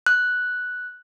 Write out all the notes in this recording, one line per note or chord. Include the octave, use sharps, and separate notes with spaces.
F#6